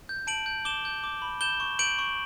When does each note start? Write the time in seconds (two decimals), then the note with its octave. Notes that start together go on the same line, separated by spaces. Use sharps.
0.09 G6
0.27 A5 D7 F#7
0.46 G6
0.65 D6 E7 G7
0.85 G6
1.04 D6
1.22 B5
1.41 G6 E7 G7
1.60 C#6
1.79 G6 D7 F#7
1.99 C#6